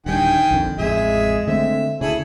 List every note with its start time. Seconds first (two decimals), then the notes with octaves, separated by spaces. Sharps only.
0.06 D1 D#3 G3 D4 G5 G#5
0.51 A#1 F2 D3
0.78 A1 F2 G#3 G#4 E5
1.47 D3 A3 C4 E5
2.01 D2 C#3 E4 G#4 A4